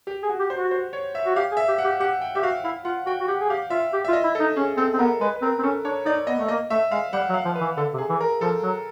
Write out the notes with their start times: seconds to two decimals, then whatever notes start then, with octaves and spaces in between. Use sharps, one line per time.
0.07 G4
0.23 G#4
0.29 F#4
0.40 G4
0.50 C5
0.56 F#4
0.71 C5
0.93 C#5
1.15 E5
1.26 F#4
1.36 G4 F5
1.52 G#4
1.57 E5
1.68 G4
1.78 F#5
1.84 G4
2.00 G4 F#5
2.21 G5
2.35 G4 E5
2.43 F#4 F5
2.64 E4 F5
2.85 F4 F#5
3.06 F#4 G5
3.21 F#4
3.28 G4 F#5
3.41 G#4
3.49 G4 F5
3.70 F4 E5
3.93 G4
4.05 F4 E5
4.13 D#5
4.24 E4
4.35 A4
4.40 D#4
4.56 C#4 G#4
4.77 C4 A4
4.94 C4
4.99 B3 A#4
5.21 G#3 B4
5.36 B4
5.42 C4 A#4
5.59 C4
5.63 C#4 A4
5.85 D4 C#5
6.06 D#4 D5
6.27 B3 D#5
6.39 A3
6.48 A#3 D#5
6.70 A3 E5
6.92 G#3 F5
7.13 G3 F#5
7.29 F#3
7.34 F5
7.45 F3
7.55 B4
7.61 E3
7.77 D3 A4
7.94 C3
7.98 G#4
8.10 E3
8.21 A#4
8.41 F3 A4
8.63 F#3